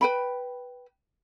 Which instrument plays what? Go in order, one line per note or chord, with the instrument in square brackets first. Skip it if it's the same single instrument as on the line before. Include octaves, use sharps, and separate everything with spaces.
[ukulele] B4 G5 B5